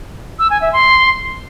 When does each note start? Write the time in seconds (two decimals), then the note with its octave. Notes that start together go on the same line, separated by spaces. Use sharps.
0.39 E6
0.50 G#5
0.62 E5
0.73 C6